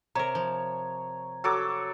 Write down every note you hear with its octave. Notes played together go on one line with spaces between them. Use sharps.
C3 A#4 C#5 A#5
F3
F#3 A4 D6